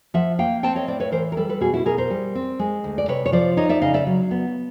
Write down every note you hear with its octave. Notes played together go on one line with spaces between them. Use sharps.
F3 E5 F#5
A#3 F5 G5
C4 G5 A5
C#5 D#5
A2 C5 D5
B4 C#5
E3 A#4 C5
A#4
G3 A4 B4
A4 B4
B2 F#4 G#4
E4 F#4
B2 G#4 A#4
A#4 C5
G3
C4
G#3
D2
D5
C3 B4 C#5
C#5
F3 C5 D5
D#4 C#5 D#5
D5 E5
C#3 D#5 F5
D5 E5
F#3
B3